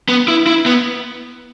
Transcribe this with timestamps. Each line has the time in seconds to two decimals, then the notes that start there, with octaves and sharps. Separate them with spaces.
0.09 B3
0.28 E4
0.47 E4
0.66 B3